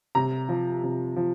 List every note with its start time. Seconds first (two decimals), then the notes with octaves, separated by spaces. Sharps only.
0.15 C3 A#5
0.49 F3
0.84 C3
1.16 F3